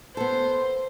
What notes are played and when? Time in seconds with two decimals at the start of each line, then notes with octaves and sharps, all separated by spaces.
0.17 B3 A4 C5